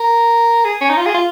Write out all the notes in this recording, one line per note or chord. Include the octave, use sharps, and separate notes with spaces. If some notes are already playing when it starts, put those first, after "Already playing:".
Already playing: A#4
G#4
C#4
D#4
F4
G#4
F4